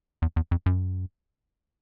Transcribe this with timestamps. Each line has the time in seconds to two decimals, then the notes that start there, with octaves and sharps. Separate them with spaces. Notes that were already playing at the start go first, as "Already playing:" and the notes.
0.22 E2
0.36 E2
0.51 F2
0.66 F#2